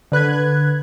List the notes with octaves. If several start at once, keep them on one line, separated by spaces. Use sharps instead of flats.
D3 B4 F#6 G#6